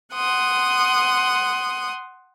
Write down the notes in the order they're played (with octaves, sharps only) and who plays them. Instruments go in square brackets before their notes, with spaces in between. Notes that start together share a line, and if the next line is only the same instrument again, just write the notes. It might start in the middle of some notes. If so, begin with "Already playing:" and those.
[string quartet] F#5 C6 D#6